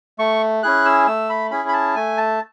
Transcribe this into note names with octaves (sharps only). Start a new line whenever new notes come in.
A3 C#6
C#4 E4 G#4 F#6
E6
A3 E6
B5
C#4 E4 G#4 B5
B5
A5
A3 G#5
A5